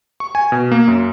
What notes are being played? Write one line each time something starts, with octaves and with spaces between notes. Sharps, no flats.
C#6
G#5
B2
A#3
F#2